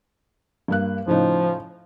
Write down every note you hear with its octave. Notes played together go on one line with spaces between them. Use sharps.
G2 A#3 F#6
A2 C#3 F3 D#4